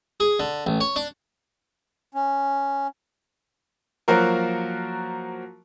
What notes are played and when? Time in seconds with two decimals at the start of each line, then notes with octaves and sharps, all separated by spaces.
0.20 G#4
0.40 D3
0.67 A1
0.81 C#5
0.96 D4
2.14 C#4
4.08 F3 F#3 A#3 F#4 A#4